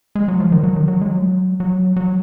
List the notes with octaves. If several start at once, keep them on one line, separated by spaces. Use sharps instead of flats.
G#3
F#3
F3
D#3
F#3
D#3
F#3
G#3
F#3
F#3
F#3